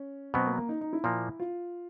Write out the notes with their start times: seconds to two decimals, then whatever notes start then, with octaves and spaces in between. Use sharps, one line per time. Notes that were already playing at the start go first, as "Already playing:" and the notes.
Already playing: C#4
0.34 B2 F#3 B3 C4
0.46 A#3
0.58 A#3
0.69 D#4
0.81 D#4
0.93 E4
1.04 A#2 F3 A#3
1.40 F4